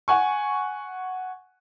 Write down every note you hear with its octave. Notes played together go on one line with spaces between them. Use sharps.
F#5 G#5 C#6